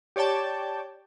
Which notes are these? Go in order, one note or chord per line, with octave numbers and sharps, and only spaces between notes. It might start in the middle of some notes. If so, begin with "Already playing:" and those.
G4 C#5 D5 G5 A5